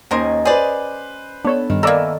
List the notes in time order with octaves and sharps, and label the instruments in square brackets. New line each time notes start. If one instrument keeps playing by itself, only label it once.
[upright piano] D#2 [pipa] D#3 A#4 C5 [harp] C#4 D#5 G#5
[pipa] G#4 D5 [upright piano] B4 C5
[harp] B3 A4 [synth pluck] D4 C#5
[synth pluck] G2 [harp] D#3
[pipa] E3 A#3 [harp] A4 [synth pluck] D5 A#5 [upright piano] E6